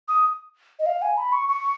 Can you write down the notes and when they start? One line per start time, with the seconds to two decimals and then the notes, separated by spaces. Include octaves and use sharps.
0.08 D#6
0.79 D#5
0.86 F5
1.02 G#5
1.17 B5
1.32 C#6
1.49 C#6